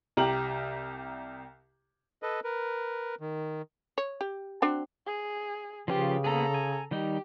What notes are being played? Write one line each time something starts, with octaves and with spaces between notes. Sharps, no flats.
C2 G4 A#5 F#7
A4 B4 D#5
A#4 B4
D#3
C#5
G4
C4 D4 F#4
G#4
C#3 F3 C#4 F4 G4 B4
A#3 B3 G#4 A4 A#5
G#5
D#3 G3 D#4 G4